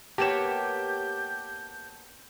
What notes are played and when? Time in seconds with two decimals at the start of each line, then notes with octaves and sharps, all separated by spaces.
0.18 A#3 B3 G4 C#5 A5 G6 E7